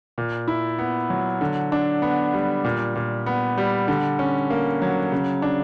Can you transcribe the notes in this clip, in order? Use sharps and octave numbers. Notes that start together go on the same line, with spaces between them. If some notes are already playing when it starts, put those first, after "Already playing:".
A#2
E4
B3
F#3
D3
D4
B3
G3
A#2
A#2
B3
G3
D3
C#4
A#3
F#3
C#3
D4